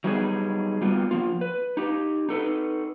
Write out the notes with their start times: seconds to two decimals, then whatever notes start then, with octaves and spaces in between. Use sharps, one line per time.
0.04 F#3 G3 B3 D4 D#4 G#4
0.82 G3 A#3 B3 F4
1.11 F3 A#3 F4
1.41 B4
1.77 D#4 G4
2.29 D#4 A4 B4